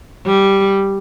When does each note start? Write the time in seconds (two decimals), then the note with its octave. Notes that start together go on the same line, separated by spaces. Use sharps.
0.26 G3